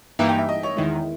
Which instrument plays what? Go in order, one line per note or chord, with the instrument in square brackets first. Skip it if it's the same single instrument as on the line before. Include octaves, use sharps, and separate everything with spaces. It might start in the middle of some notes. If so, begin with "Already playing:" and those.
[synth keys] G2 E3 A#3 D#4 G4 [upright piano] E5
[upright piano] G5
E5
D#5
C#5
[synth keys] E2 D#3 G#3 [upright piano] E4